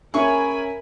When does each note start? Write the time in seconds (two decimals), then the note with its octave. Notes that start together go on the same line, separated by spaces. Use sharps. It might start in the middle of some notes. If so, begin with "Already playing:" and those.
0.14 C#4 G#4 A#4 E5 G#5 B5 C#6